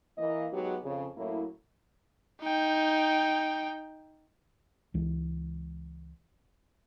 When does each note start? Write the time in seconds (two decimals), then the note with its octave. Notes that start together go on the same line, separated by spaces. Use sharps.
0.18 E3 A#3 D#5
0.52 F#3 G#3 B3 D#4 F#4 G4
0.84 F2 C#3
1.16 F#2 A2 F#3 A#3 E4
2.42 D#4 G5
4.94 C#2 E3 G#3